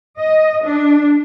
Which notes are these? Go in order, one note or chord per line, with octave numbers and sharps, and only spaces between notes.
D#5
D4